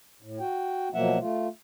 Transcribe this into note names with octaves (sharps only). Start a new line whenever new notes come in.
A2
F#4 G5
B2 F3 F#3 A#3 E5 F#5
A3 F4